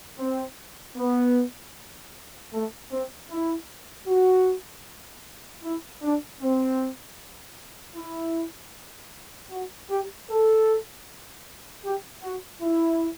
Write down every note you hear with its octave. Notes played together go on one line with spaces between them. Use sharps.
C4
B3
A3
C4
E4
F#4
E4
D4
C4
E4
F#4
G4
A4
G4
F#4
E4